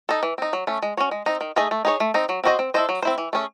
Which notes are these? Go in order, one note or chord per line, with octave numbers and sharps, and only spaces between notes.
D#4 A4
E3
C4 D#4
F#3
A3 C#4
G#3
C#4 F#4 C#5
G#3
C4 D#4
D#3
A3 D#4 G#4 D#5
A3
D#4 G#4 C#5
A3
C4 D#4
F#3
C4 F#4 C5 D#5
C4
E4 A4 C5 D#5
F#3
C4 E4 C5
E3
A3 C#4 G#4